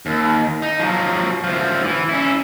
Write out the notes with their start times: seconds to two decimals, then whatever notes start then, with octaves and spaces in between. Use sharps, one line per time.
0.06 D#2
0.62 D#4
0.80 F3 F#3
1.44 D2 F3
1.84 E3
2.09 C#4 E4